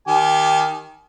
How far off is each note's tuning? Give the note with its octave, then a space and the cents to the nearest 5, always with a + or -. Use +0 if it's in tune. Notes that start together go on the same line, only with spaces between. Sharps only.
D#3 +0 G4 +0 G#5 +40